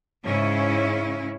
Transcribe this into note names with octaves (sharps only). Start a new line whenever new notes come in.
G#2 C#3 C#4 E4